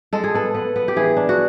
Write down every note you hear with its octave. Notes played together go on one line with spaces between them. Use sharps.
G#3 A4
G#4
B3 A4
B3
B3
G4
E3 G#4
D4
F#4